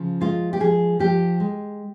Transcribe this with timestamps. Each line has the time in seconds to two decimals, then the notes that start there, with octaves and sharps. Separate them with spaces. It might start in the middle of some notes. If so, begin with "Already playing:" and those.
Already playing: C#3 F3
0.21 G#3 F4
0.53 G4
0.60 F3 G#4
0.99 F3 G4
1.40 G#3